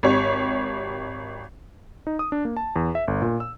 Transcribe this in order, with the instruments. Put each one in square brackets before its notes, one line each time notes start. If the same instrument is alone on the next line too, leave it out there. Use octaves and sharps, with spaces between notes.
[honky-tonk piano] G#1 G4 C#5
[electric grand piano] D#4
D#6
D4
A#3
A5
E2
E5
G1
A#2
E6